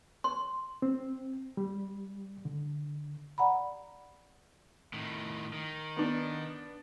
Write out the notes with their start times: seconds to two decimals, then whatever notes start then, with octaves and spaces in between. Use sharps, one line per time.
0.24 C6
0.82 C4
1.57 G3
2.45 D3
3.38 D5 F#5 A#5 B5
4.94 A2 D#3
5.53 D#3
5.96 B3 D4